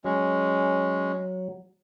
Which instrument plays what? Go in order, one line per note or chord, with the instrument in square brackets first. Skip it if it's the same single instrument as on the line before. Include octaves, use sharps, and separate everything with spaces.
[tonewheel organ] F#3 [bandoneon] G#3 C#4